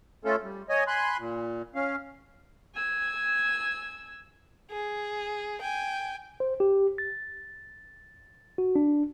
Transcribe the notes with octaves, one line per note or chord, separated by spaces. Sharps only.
A3 C#4 F4 A4
G3
C#5 D#5 G#5
G#5 B5 C6 F#6
A#2
C#4 F5
G#5 E6 G#6
G#4
G5 G#5
C5
G4
A6
F#4
D4